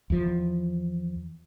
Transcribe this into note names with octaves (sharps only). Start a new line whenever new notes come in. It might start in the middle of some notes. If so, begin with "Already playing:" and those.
E2 F3